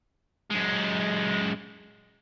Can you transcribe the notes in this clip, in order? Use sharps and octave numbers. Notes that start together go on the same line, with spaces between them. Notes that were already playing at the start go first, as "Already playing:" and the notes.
F#2 G#3